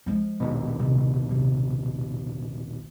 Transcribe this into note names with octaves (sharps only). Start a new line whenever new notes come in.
F3 G#3
A#1 D#2 B2
C3 G3
C3 D4